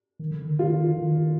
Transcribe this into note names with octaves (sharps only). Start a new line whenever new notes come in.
D#3
D3
D#3
D#3 F4
D#3